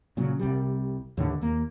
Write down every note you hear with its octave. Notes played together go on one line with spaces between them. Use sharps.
A#2 C#3 F#3
C2 C3 G3
D#2 A2 D3
D#2 A#3